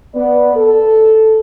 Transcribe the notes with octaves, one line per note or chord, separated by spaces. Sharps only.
B3 D5
A4